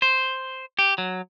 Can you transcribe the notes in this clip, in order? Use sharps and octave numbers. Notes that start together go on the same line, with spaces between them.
C5
G4
F#3